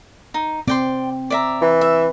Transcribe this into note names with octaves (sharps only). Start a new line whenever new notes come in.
D#4
C4 D5 G5 C6
D5 E5 A#5
E3
E5